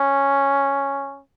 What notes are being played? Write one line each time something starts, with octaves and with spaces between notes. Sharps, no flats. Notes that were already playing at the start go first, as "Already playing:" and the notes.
Already playing: C#4